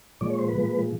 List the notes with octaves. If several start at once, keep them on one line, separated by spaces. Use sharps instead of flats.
A#2 F3 G#3 D5
C#5
C5
B4
A#2 F3 G#3